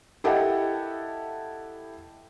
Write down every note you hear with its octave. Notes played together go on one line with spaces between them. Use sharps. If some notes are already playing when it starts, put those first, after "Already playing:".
E4 G4 A4 D#5 F#5 A5